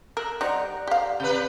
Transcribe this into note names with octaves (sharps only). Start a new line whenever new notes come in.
A#4 E6 F#6
G3 D#4 C5 D5 F#5 A#5
G4 F5
C3 B4 G6